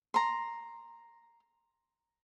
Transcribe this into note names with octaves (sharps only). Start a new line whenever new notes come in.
A#5 C6